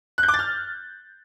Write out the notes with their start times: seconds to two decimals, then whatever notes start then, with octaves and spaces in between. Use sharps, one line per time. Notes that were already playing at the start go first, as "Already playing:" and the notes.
0.18 F#6
0.23 G6
0.28 D6
0.34 A6
0.39 F6